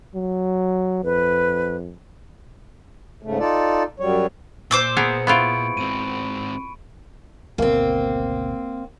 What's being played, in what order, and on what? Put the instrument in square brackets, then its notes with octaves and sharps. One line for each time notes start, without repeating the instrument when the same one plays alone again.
[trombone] F#3
[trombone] F2 [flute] B4
[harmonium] G#2 C#3 A3
D#4 F4 A4 D5
F#2 F#3 G3 C#5
[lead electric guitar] A#2 [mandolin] C5 D6 E6
[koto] B3 G#4 A#4 [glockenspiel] C#7
[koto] B3 E4 F4 [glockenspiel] B5 C#6 D7
[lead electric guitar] G#2 C4 [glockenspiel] D#7
[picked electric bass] G#1 D2 B2 [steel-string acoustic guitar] A#3 C4